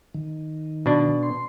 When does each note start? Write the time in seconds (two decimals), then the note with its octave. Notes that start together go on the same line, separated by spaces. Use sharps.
0.14 D#3
0.86 B2 D4
1.23 C6